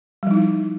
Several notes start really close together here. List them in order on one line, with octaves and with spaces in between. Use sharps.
G3 F3 D#4 E4